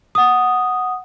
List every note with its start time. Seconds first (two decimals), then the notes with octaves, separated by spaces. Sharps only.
0.15 F#5 D#6